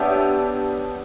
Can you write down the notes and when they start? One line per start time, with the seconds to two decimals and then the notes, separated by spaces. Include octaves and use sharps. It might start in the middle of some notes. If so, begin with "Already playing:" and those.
Already playing: B3 D4 G4 C#5 E5